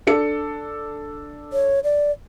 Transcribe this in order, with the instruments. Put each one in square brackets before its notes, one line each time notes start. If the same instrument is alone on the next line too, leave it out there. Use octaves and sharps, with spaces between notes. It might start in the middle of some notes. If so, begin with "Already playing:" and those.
[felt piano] D4 A4 C#7
[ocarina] C#5
D5